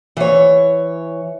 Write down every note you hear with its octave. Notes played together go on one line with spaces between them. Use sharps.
E3 C#5